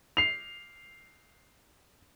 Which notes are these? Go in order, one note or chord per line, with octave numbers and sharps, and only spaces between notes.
C7 F7